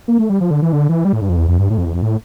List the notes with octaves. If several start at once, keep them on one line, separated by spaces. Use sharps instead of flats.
A#3
A3
G3
F3
D3
E3
D3
E3
G3
A2
G2
F2
E2
F2
G2
A2
F2
E2
F2
A2